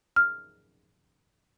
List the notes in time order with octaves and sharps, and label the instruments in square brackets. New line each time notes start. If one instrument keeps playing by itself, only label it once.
[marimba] F6